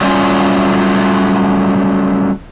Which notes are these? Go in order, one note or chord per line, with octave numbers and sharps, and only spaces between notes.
F#3 G3 A3 B3 C#4 F4